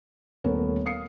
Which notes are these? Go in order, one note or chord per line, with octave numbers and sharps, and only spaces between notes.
D#1 A3 B3 A#4 C#5
F5 D#6 C7 C#7